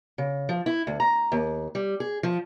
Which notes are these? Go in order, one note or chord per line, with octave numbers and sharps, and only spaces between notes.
C#3
F3
E4
D2
A#5
D#2
G3
G#4
F3